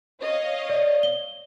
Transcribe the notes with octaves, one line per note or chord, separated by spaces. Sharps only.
C#5 D#5 F5
D5
G7